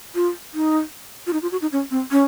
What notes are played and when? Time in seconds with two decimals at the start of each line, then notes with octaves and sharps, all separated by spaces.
0.15 F4
0.54 D#4
1.27 F4
1.33 D#4
1.42 F4
1.52 F#4
1.62 D#4
1.72 C#4
1.91 C4
2.11 C#4